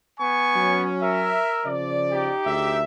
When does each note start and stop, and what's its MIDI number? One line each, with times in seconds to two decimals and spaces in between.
0.19 0.86 59
0.19 0.86 80
0.19 0.86 85
0.55 1.38 54
0.55 1.38 61
1.00 1.70 70
1.00 1.70 76
1.66 2.31 49
1.66 2.31 53
1.66 2.31 74
2.11 2.79 63
2.11 2.79 67
2.45 2.82 38
2.45 2.82 68
2.45 2.82 76